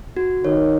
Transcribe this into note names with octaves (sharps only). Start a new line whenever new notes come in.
F#4
D#3 C#5